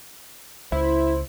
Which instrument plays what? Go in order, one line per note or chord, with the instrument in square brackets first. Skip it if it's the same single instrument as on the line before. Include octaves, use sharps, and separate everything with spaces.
[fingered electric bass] C#2 [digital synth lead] E4 [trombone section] C5